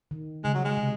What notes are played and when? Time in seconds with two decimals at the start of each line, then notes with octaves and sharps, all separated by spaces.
0.11 D#3
0.44 C#3 G#3
0.54 F#3
0.65 G#3
0.77 C3